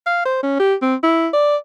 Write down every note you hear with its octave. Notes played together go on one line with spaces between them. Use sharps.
F5
C5
C#4
G4
C4
E4
D5